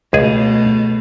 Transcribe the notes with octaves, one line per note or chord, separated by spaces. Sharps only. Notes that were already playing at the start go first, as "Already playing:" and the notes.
C#2 B2 A3 G#4